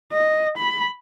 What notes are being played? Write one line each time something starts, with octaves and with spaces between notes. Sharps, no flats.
D#5
B5